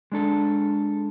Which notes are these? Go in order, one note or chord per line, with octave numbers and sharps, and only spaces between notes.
G#3 D4 A4